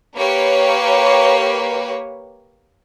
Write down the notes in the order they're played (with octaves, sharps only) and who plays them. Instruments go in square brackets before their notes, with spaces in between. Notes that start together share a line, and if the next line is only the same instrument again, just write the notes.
[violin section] A#3 G4 B4 C#5